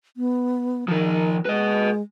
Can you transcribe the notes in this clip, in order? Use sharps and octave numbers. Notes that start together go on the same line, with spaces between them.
B3
D#3 F3 A#4
G#3 B4 D#5